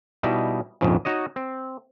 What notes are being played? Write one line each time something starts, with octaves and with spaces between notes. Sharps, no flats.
B2 G3 D#4 E4
A#1 F2 G#2 C#3
D#4 F#4 C#5 D#5
C4